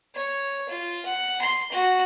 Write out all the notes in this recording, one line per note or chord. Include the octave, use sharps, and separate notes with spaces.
C#5
F4
F#5
C6
F#4